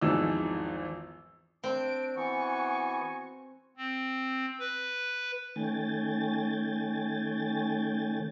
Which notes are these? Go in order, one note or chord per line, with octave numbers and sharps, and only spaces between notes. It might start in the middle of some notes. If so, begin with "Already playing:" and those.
G#1 E2 E3 F3 D#4 E6
C4 D4 D7
E3 B3 F#4 G#5 C#6
C4
B4
D#3 A3 C#4 G5 G#5 A6